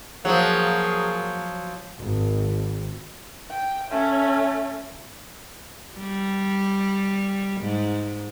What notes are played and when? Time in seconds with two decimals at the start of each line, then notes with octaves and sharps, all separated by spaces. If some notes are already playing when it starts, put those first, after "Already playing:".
0.25 F3 F#3 A#3 F#4 G#4
1.99 G#1
3.50 G5
3.91 A3 C#4
5.98 G3
7.61 G#2